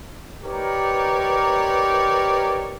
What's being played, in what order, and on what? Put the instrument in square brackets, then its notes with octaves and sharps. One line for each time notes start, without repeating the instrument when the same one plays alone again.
[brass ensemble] D#4 G4 A#4 B4 C#5 D5